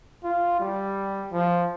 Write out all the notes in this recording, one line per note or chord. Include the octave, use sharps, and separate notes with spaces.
F4
G3
F3